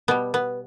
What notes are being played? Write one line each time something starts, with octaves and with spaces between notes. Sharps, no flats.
B2 G3 B3
B3